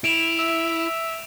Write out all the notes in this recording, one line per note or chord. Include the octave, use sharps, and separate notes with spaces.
E4 D7 E7 F7
E5